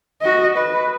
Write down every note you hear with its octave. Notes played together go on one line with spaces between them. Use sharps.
F#4 D#5
B4